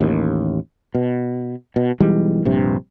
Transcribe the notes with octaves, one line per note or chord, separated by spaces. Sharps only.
A1 D#2
B2
B2
B1 E3 G3 G#3
A#1 G2 C3